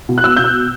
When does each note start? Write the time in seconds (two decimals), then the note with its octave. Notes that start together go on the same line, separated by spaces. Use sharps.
0.09 B2
0.18 F#6
0.24 B3 E6
0.37 B2 G6
0.44 F#6